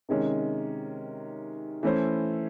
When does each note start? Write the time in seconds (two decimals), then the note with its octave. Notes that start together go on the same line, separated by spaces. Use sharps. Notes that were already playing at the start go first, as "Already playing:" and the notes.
0.09 C3 D#3 G#3 C#4
1.83 E3 A3 C#4 E4 C5